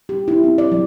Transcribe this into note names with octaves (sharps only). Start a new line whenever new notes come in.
G4
E4
C4
D5
F#3